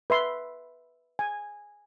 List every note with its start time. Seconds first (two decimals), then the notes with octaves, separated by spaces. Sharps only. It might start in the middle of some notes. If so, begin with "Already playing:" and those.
0.10 B4 E5 C6
1.19 G#5